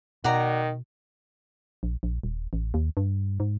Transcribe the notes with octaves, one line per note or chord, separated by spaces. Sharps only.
B2 D#3 F#4 D5 A#5
A#1
A#1
D#1
A1
D#2
G2
G#2